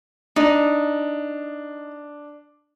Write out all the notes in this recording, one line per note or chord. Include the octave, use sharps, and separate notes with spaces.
D4 D#4